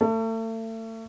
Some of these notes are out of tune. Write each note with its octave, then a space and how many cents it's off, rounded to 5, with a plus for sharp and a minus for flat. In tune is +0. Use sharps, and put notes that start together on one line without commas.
A3 +35